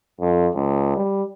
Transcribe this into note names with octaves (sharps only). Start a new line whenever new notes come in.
F2
C#2
G3